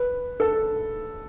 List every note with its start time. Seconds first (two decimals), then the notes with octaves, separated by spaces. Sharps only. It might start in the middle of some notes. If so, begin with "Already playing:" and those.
Already playing: B4
0.40 A4